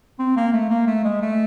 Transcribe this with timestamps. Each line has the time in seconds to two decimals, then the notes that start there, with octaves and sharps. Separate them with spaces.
0.19 C4
0.37 A#3
0.53 A3
0.70 A#3
0.87 A3
1.04 G#3
1.22 A3